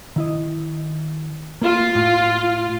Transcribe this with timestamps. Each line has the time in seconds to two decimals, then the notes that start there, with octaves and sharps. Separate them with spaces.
0.16 D#3 E4 D#5
1.62 A#3 F4
1.95 A2